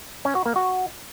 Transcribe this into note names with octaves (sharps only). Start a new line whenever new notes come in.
C#4
F#4
A#3
F#4